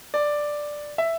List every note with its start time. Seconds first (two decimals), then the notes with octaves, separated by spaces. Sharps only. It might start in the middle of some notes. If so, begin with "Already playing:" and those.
0.14 D5
0.98 E5